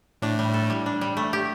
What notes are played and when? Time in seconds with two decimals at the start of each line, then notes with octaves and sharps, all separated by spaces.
0.22 A2 D4
0.39 G3
0.54 A4
0.70 G3
0.86 D4
1.01 G3
1.17 A3
1.33 G4